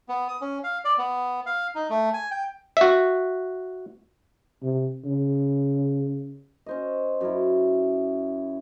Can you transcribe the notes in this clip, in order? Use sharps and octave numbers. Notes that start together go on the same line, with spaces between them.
B3
D#6
C#4
F5
D5
B3
F5
D#4
A3
G#5
G5
F#4 E5
C3
C#3
C#4 C5 D#5
F#2 C#4 E4